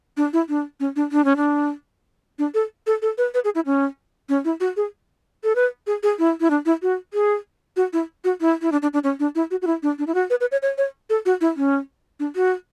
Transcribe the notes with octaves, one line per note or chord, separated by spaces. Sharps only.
D4
E4
D4
C#4
D4
D4
C#4
D4
D4
A4
A4
A4
B4
B4
G#4
E4
C#4
C#4
E4
F#4
G#4
A4
B4
G#4
G#4
E4
E4
D4
E4
F#4
G#4
F#4
E4
F#4
E4
E4
D4
D4
D4
C#4
D4
E4
F#4
F#4
E4
D4
D4
E4
F#4
B4
B4
C#5
C#5
C#5
A4
F#4
E4
C#4
D4
F#4